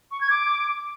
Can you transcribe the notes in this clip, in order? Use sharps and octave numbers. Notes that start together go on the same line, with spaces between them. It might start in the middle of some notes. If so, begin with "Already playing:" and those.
C#6
G#6
D6